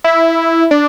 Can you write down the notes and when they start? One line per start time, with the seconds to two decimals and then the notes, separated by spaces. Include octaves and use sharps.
0.04 E4
0.71 D4